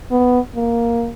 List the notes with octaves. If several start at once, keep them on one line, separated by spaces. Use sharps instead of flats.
B3
A#3